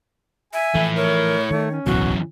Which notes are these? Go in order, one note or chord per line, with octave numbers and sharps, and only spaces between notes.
E5 G#5
E3 F3 A3 E4
A#4 C#5
D#3 A3
C#4
D1 B1 F#2 B2 E3 F#4